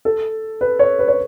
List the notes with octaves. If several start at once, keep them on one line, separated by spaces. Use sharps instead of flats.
A4
B4
C#5
B4
C#5